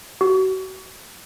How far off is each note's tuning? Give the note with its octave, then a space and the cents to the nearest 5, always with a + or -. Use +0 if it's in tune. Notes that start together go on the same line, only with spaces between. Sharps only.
F#4 +35